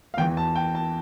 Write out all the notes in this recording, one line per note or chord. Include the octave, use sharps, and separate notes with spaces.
F5
E2 E3 G5
A5
G5
A5